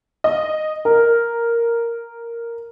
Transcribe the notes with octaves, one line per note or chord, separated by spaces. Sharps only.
D#5
A#4